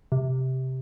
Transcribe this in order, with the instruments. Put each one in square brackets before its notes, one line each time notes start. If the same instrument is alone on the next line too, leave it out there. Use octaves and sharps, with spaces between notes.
[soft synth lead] C3